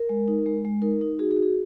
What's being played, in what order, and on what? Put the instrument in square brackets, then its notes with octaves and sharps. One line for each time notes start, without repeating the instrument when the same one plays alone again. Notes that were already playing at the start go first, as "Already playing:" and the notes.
Already playing: [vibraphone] A#4
G#3
D#4
G#3
G#3
D#4 A#4
D#4
F#4 G#4
G#4
F#4
G#4